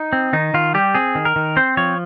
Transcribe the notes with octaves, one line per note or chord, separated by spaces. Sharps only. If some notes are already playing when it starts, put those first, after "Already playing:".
Already playing: D#4
C4
D#3 D#4
D#3 F4
G3 G4
C4 G#4
D#3
A#4
D#3
C4 C5
F3 C#5